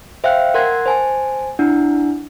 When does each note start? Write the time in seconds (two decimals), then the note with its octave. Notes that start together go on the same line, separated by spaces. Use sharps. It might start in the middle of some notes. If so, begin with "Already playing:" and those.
0.24 C5 E5 F5 G5 F#6
0.54 A#4 F#5 C6 F#6 G#6 A#6
0.86 C5 G#5 A5
1.59 D4 E4 F#5